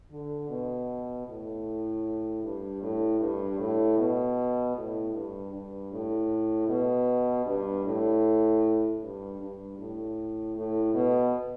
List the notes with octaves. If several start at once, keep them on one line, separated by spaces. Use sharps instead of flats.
D3
B2
A2
G2
A2
G2
A2
B2
A2
G2
G2
A2
B2
G2
A2
G2
G2
A2
A2
B2